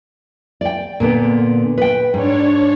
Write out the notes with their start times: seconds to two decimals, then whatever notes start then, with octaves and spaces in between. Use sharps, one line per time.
0.61 D5 G5
1.00 A#2 D3 B3
1.78 B4 G5
2.14 G#2 D4 C#5